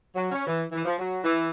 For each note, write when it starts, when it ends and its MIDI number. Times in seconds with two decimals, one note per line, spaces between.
0.15 0.30 54
0.32 0.43 61
0.46 0.63 52
0.72 0.83 52
0.85 0.95 53
0.99 1.19 54
1.24 1.50 52